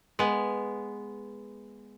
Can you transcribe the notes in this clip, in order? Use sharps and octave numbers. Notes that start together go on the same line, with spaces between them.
G#3 B3